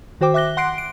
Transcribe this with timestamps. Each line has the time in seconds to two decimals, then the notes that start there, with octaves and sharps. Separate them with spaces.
0.21 D#3 F#4 C5 G5 D6
0.34 E5 D6 F#6 A#6 G7
0.57 F#5 C6 F#6 C7 D7
0.78 D7